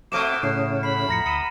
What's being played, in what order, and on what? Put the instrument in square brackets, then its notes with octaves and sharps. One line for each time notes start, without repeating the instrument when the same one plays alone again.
[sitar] B2 A3 C5 [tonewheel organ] C4 [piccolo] D6 [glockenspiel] F6 D7 E7
[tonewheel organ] A2 C#3 C#4 [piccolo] C7
[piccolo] B5 [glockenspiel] C7
[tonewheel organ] F2 A2 [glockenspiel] A#5 A#6 C#7
[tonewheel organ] D2 D#6 [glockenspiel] C#7 D#7 E7